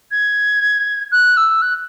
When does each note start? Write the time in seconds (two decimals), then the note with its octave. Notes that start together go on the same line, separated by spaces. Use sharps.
0.11 G#6
1.12 F#6
1.37 E6
1.62 F#6